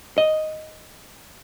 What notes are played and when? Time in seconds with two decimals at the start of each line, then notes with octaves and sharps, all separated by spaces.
0.18 D#5